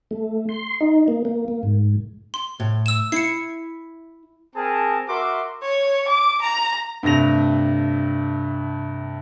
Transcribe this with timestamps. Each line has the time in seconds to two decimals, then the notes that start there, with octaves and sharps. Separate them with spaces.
0.11 A3
0.49 C6
0.81 D#4
1.08 A#3
1.25 A#3
1.48 A#3
1.63 G#2
2.34 C6
2.60 A2
2.86 E6 E7
3.12 E4 C7 C#7
4.56 C4 G#4 A#4 A5
5.08 F#4 A#4 E5 C6 D6
5.62 C#5
6.08 D6
6.41 A#5
7.03 G2 C3 A3 A#6 F7